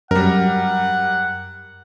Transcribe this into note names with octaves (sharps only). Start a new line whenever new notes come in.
F#2 G3 A#4 F#5